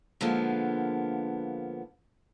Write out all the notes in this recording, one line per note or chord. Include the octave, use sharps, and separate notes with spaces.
D3 F3 G#3 A#3 B3